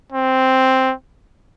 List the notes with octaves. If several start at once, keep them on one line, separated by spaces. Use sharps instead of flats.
C4